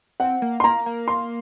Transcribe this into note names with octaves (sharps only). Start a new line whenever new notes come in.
C4 F#5
A#3
C6
A#3 A#5
A#3
C6